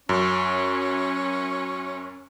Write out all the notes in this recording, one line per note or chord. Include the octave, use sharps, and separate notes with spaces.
F#2 C#4